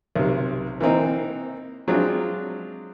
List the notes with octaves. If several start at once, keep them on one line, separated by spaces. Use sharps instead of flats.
B1 C3
E3 A#3 C4 D#4
F#3 G#3 C4 D4 F4